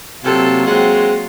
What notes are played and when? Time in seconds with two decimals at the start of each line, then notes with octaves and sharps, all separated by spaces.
0.25 C3 F#3 A#3 F4 A4
0.67 G#3 C4 F#5